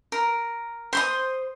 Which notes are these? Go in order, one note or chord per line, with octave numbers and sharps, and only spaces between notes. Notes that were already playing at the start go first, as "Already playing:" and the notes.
A#4
C5 C6 D#6